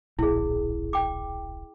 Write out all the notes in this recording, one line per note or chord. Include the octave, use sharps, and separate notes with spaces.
D1 A#1 E4 G#4
G5 D6